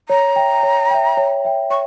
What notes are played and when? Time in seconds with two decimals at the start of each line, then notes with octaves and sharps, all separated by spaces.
0.09 C#5 A#5
0.36 E5 G5
0.63 C#5
0.91 E5 G5
1.17 C#5
1.45 E5 G5
1.70 C#5 C#6